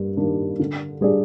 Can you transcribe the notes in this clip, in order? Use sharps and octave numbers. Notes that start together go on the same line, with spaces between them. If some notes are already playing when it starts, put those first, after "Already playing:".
Already playing: G2 A#3
D#3 G3 A#3 D4
D3
G3 D4 G#4 D5